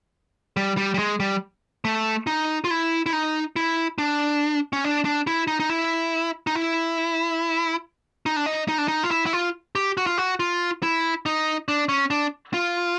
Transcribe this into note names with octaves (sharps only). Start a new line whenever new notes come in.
G3
G3
G3
G#3
G3
A3
D#4
F4
E4
E4
D#4
E4
D4
C#4
D4
D4
E4
D#4
D#4
E4
D#4
E4
D#4
D4
D#4
D#4
D4
D#4
F4
E4
E4
F4
G4
F#4
F4
F#4
F4
E4
D#4
D4
C#4
D4
F4